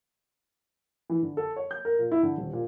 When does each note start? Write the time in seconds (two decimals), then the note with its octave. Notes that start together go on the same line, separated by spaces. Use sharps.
1.10 E3
1.22 D3
1.37 A4
1.56 C#5
1.71 G6
1.85 A#4
1.99 A#2
2.12 E4
2.23 D3
2.37 D#1
2.53 A#2